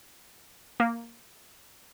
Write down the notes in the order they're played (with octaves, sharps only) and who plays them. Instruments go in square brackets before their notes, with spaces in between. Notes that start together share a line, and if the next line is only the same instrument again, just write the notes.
[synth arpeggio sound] A#3